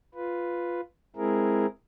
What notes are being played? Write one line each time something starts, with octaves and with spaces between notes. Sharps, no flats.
F4 B4
G#3 C4 E4 G#4 A#4